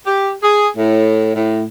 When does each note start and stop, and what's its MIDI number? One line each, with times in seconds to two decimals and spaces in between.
0.06 0.32 67
0.42 0.67 68
0.77 1.31 45
1.35 1.62 45